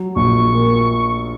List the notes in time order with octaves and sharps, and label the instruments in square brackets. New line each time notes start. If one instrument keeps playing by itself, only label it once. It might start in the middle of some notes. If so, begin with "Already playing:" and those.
Already playing: [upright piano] F#3
[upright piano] A#1 [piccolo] C#6
[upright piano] A#2